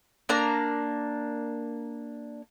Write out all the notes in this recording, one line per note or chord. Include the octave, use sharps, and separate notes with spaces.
A#3 D4 A#5